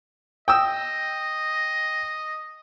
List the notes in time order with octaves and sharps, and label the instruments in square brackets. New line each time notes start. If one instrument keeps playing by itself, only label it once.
[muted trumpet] D#5 [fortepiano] G5 D#6 E6